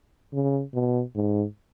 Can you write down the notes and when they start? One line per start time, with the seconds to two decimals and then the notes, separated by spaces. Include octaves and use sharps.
0.33 C#3
0.74 B2
1.15 G#2